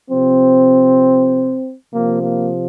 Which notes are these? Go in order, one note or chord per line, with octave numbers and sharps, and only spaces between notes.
C3 F3 C4
C3 F3 A#3
A#3